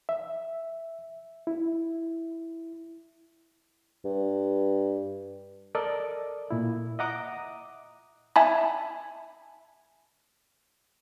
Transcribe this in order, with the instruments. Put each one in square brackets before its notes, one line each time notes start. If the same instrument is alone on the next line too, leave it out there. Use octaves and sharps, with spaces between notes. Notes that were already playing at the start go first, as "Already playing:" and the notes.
[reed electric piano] E5
E4
[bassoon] G2
[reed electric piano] A4 A#4 D5 D#5
A#2 E4
D#5 E5 F#5 A#5 D6 D#6
[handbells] E5 G#5 A5 B5